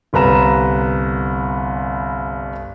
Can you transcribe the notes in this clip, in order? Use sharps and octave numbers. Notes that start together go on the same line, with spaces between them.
G1 C2 B4 A#5 E7